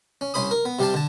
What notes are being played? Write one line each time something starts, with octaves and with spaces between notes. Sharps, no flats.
C#4
C2 C#4 C5 B5 D#6
A#4
B3
C3 G3 G4 F5 A5
D3 A5